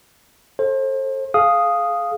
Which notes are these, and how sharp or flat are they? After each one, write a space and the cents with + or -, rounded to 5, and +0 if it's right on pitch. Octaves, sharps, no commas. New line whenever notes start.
A4 +5 C5 +35
G#4 +30 F5 +0 D#6 +0